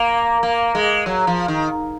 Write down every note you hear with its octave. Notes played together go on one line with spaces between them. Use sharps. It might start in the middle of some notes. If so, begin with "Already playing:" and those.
Already playing: A#3
A#3
G#3
F#3
F3
D#3